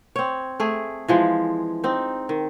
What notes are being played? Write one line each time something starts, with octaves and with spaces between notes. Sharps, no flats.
C4 C#5
A3 G#4
E3 F3 G#3
C4 D#4
D#3